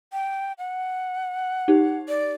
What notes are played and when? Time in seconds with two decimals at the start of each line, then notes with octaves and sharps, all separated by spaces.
0.13 G5
0.58 F#5
1.68 D#4 G4
2.09 D5